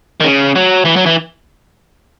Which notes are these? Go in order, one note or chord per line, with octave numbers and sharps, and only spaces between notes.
D#3
C#3
F#3
E3
F#3
E3